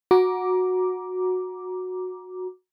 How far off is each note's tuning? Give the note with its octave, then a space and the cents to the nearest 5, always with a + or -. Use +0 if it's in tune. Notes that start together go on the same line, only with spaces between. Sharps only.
F#4 -10 A#5 +20 D6 -5